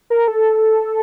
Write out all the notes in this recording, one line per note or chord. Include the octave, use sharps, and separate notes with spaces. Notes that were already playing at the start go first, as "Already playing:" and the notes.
A#4
A4